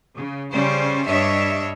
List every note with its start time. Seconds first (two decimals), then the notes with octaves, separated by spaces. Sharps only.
0.16 C#3
0.52 C#3 G3 C#4 C5 D5
1.08 G2 G3 D4 C#5 D#5 E5